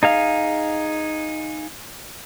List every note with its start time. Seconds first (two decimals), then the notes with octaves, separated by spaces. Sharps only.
0.03 D#4 G#4 F5